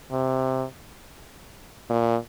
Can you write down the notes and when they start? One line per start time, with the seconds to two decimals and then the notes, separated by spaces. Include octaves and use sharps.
0.12 C3
1.90 A#2